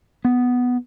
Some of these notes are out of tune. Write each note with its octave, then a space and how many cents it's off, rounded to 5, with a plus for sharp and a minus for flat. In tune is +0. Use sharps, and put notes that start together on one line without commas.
B3 +5